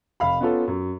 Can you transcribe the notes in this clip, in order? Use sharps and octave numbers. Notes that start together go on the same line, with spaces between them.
F1 F5 B5
B3 C#4 F4 A4
F#2